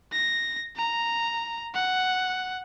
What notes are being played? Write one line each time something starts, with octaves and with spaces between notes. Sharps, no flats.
A#6
A#5
F#5